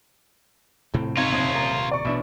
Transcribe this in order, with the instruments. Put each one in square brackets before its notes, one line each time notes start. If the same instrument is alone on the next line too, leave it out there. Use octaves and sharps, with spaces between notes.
[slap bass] D#1 C3 C4 [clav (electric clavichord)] A2
[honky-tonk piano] G#1 [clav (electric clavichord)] D#4 [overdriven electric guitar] F4 C#5
[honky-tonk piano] F#1 F2
[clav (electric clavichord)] A#4
[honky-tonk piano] D5 C#6
[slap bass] A1 D4 [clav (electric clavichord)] B2 E5